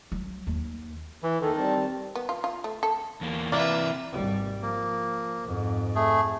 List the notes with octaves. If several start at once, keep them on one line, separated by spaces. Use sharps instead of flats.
F#3
D#2
E3
D#2 D#3 A4
G3 C4 A5
B3
F4
F4
A3
A4
E2 A#3
C3 E3 A#3 D4 B4 D5 E5
G#1 G3
F3 A#3
F2 G#2
A3 G#4